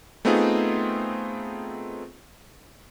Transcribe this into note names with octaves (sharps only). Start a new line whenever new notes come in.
A3 B3 C4 D#4 F4 G#4